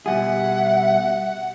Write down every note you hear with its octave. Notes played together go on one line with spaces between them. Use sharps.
B2 G3 G#4 E5 F#5